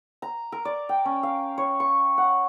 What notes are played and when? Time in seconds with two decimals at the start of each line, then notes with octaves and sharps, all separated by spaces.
0.22 A#5
0.52 A#4
0.65 D5
0.89 G5
1.05 C#4
1.23 F5
1.58 C#5
1.80 C#6
2.18 F#5